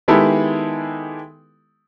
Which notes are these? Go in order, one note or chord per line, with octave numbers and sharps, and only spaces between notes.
D#3 G#3 B3 E4 G4 A4